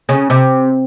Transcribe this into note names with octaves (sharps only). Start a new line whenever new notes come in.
C#3
C3